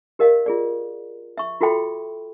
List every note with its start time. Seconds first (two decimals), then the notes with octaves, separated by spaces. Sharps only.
0.19 G4 A#4 D#5 F5
0.46 F4 G#4 D5
1.38 E5 C#6
1.61 F4 F#4 A4 E5 G5 B5